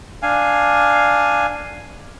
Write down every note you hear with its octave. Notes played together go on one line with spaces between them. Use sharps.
D4 F5 G#5